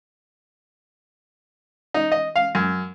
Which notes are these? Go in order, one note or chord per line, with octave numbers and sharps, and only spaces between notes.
D#4
D#5
F5
F#2